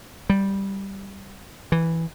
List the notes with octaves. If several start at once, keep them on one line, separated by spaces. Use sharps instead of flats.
G3
E3